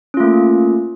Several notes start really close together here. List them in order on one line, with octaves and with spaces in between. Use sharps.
C#4 F4 A3 A#3